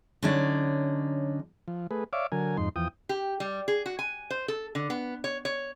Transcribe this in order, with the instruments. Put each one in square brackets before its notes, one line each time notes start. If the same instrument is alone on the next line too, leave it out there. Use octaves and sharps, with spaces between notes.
[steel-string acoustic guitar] D3 F#3 C#4 D#4 C#5 D5
[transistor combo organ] F3
A3 G#4 B4
C#5 D5 E5 F5 D6
D3 F#3 A#4 G#5
F2 G#2 D#4 C6
E2 F3 G5 D#6
[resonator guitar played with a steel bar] G4
G3
G#4
F#4
G#5
C5
A4
D3
B3
C#5
C#5